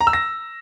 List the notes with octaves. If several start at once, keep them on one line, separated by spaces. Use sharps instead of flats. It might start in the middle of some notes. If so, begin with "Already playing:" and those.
A#5
E6
A#6